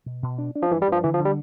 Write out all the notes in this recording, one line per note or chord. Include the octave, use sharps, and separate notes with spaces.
B2
B2
D4
D4
F3
G2 E3
G3
G2 F3
D3 E3
F3
D3
G3